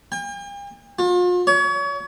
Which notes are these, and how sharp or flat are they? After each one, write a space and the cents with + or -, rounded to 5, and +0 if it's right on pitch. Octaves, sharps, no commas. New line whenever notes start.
G5 +45
F4 +40
C#5 +35